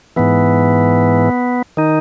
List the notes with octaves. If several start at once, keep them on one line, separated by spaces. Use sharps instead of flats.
G#2 E3 B3
D#3 D#4